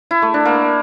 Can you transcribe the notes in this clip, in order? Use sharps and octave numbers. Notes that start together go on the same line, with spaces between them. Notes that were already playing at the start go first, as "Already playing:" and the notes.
E4
A3
D4
A#3